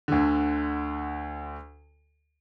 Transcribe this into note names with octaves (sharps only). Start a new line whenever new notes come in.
D2 D3